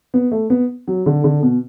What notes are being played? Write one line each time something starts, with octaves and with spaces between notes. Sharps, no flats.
B3
A3
B3
F#3
D3
D3
B2